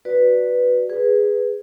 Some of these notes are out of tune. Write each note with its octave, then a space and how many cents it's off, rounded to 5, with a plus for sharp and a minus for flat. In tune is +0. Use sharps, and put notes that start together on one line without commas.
F#4 +0 B4 +0 D5 +0
G#4 -10 B4 +0